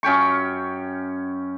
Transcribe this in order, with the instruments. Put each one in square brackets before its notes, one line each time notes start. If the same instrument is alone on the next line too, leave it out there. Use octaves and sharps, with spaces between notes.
[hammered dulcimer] F#2 C#4 G5 C#6